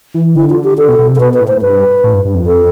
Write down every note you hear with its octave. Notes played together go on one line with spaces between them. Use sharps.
E3
D3 E4
F4
G4
D3 A4
B2
B2
C3
A4
B2 B4
B4
A2
C5
A2
G2 B4
A2
G2
G2
F2
A4